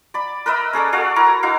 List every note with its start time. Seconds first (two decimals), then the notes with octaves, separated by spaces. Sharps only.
0.14 D5 B5
0.46 A#4 B4 D#5 E5
0.73 C#4 G#4 A4 D5
0.93 F#4 A4 D5 F5
1.16 E4 A#4 A#5 C#6
1.43 D#4 E4 F#4 F5